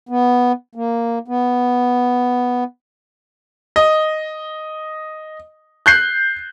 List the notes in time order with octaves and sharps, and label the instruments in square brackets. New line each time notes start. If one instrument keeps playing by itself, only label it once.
[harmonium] B3
A#3
B3
[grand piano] D#5
F#6 G6 C7